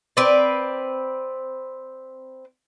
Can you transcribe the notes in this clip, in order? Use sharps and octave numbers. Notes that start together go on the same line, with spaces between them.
C4 B4 D5